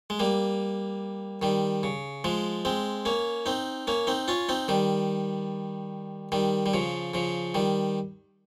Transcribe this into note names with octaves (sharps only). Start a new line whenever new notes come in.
G#3
G3 A#3
D#3 G3
C#3
F3 G#3
G#3 C4
A#3 C#4
C4 D#4
A#3 C#4
C4 D#4
C#4 F4
C4 D#4
D#3 G3
D#3 G3
G3
C#3 F3
C#3 F3
D#3 G3